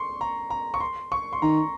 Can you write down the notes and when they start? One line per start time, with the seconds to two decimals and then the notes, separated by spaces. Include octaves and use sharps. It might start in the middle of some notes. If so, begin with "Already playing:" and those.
Already playing: C6 C#6
0.21 A#5
0.50 A#5
0.74 C#6
0.80 C6
1.12 C#6
1.33 C6
1.42 D#3 A#5